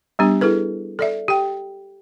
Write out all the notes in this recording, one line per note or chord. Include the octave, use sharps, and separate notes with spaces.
G3 B3 D4 G4
E4 G#4 A4 B4
A4 D5 E5
G4 G5